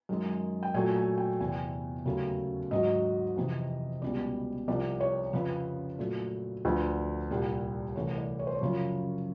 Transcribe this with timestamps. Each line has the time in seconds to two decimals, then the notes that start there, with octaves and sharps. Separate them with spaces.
0.09 F#2 D#3 G#3
0.63 G5
0.74 A#2 F#3 A3 G#5
0.96 G#5
1.18 G5
1.40 E2 C3 E3 G#5
1.48 G5
1.55 G#5
2.05 D#2 C#3 F#3 A3
2.71 G#2 D#3 F#3 D#5
3.36 F2 C3 E3
4.02 C#2 B2 G3 D5
4.68 C2 C3 F3 D5
5.00 C#5
5.33 F2 C#3 F3 B4
5.99 A#2 F#3 A3
6.65 D2 D3 F3 B4
7.31 C2 A#2 G3
7.96 C2 C3 E3 A3 C#5
8.18 D5
8.39 C#5
8.47 C5
8.55 C#5
8.61 F#2 C#3 F3